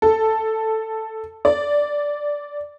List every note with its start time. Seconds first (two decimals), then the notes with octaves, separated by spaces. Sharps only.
0.02 A4
1.45 D5